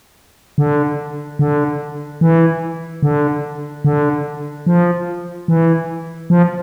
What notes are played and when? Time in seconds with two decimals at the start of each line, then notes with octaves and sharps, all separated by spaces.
0.58 D3
1.39 D3
2.21 E3
3.03 D3
3.85 D3
4.66 F3
5.48 E3
6.30 F3